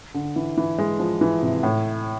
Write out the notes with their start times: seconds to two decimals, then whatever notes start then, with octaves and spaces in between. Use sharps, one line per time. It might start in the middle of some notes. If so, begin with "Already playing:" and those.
0.14 D3
0.36 E3
0.57 E3
0.78 G#3
1.00 F3
1.21 E3
1.42 C3
1.63 A2